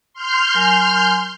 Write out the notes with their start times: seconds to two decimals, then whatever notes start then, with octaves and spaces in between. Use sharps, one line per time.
0.14 C6 F6 G6
0.55 F#3 A#4 G#5